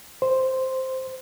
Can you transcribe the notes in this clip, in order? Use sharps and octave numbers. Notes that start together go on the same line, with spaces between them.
C5